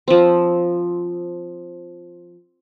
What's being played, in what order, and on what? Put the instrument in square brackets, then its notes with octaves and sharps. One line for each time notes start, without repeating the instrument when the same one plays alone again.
[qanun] F3 C4